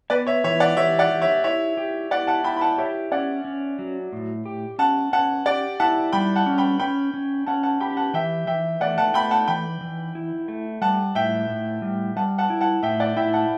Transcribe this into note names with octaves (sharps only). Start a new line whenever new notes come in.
B3 B4 D5
C#5 E5
E3 C#5 E5
D5 F#5
G4 C#5 E5
D5 F#5
G4
C#5 E5
E4 C#5 E5
G4
E4 D5 F#5
F#5 A5
E4 G5 B5
B5
F#5 A5
G4 C#5 E5
C#4 D5 F#5
C#4
F#3
A2
G4
C#4 F#5 A5
C#4 F#5 A5
G4 D5 F#5
E4 F#5 A5
G3 G5 B5
F#5 A5
C#4
G5 B5
C#4 G5 B5
C#4
C#4 F#5 A5
F#5 A5
G4 G5 B5
F#5 A5
E3 E5 G5
E3 E5 G5
A3 D5 F#5
F#5 A5
A3 G5 B5
F#5 A5
E3 G5 B5
E3
E4
A3
G3 F#5 A5
A2 E5 G5
A2
G3
G3 F#5 A5
F#5 A5
E4
F#5 A5
A2 E5 G5
D5 F#5
E4 E5 G5
F#5 A5